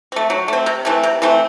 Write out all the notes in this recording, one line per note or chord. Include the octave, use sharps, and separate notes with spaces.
A3 C4
F#3
A3 C4
C3
E3 A3 C4
C3
E3 A3 C4